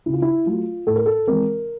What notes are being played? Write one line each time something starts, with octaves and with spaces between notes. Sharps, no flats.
C#3 E4
F4
E4
F#3 A3 F4
A2 A4
A#4
A4
E3 G#3 C4 A#4